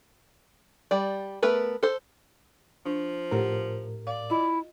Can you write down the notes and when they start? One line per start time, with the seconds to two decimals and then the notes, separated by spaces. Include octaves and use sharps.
0.91 G3 D5
1.43 A3 B3 A#4 B4
1.83 A4 C5
2.86 F3 D4
3.31 A2 G4 A#4 C5 F#5
4.07 D5 F5
4.30 E4 F4 D#5